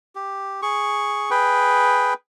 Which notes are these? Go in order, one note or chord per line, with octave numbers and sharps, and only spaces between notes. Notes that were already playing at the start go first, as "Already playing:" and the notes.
G4
G#4 C#6
G#4 B4 G5